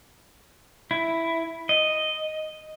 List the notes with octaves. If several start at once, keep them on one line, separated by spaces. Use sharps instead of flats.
E4
D#5